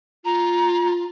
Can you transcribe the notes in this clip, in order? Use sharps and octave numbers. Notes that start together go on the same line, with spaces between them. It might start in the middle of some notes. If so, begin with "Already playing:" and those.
F4 A#5